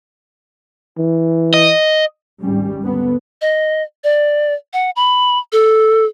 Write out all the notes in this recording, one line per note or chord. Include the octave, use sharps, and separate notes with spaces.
E3
D#5
G#1 D2 G3 C#4
D#2 D3 B3
D#5
D5
F#5
B5
A4